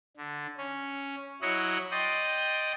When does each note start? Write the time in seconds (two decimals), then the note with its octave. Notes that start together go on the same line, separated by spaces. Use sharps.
0.17 D3
0.58 C#4
1.42 F#3 E4 C#5 D#5 F#5
1.91 D5 D#5 G5 C6 D#6